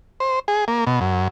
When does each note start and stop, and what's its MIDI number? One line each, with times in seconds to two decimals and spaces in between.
0.20 0.39 72
0.48 0.65 68
0.68 0.85 58
0.87 1.00 47
1.01 1.28 42